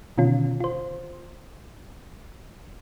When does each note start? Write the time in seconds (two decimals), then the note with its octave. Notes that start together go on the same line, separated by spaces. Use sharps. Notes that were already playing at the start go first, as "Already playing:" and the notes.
0.18 B2 D3 D#3 C#4 F4
0.60 F4 C5